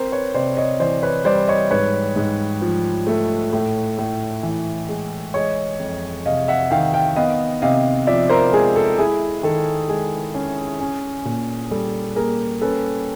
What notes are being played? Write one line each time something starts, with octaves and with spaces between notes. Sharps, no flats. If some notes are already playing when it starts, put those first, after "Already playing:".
Already playing: C4 A#4 C5
B4 C#5
C3 C5 D5
C#5 D#5
E3 C5 D5
B4 C#5
G3 C5 D5
C#5 D#5
G#2 B4 C#5
G#2
F3
A3
A2
A2
E3
G#3
G#3 C#5 D#5
F2
C3 D#5 F5
E5 F#5
D#3 F5 G5
F5 G5
B3 D#5 F5
C3 D#5 F5
F3 D5 E5
A#4 C5
G#3 G#4
A4
E4 G#4
D#3 A4
G#3 G#4
C#4
C#4
A#2
G3 A4
A#3 G#4 A#4
C#4 A4 B4